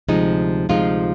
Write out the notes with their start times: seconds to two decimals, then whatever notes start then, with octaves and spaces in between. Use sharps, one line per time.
0.09 D2 C3 F3 G#3 D#4
0.69 D2 C3 F3 G#3 D#4 F4